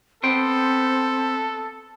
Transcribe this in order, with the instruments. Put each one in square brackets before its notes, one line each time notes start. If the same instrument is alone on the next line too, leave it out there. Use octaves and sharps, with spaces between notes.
[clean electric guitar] B3 C5 G5 [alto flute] C4 [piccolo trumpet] A4